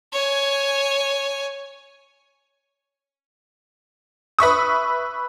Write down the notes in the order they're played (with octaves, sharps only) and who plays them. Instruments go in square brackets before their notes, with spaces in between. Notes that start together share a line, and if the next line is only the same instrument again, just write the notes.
[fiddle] C#5 G#5
[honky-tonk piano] B4 E5 C#6 D#6